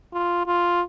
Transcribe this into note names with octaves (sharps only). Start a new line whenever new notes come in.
F4
F4